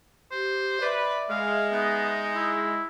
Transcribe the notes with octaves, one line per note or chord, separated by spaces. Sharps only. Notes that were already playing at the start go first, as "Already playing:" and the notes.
G4 C5
B4 D5 E5
G#3 F5
B3 D#4
E4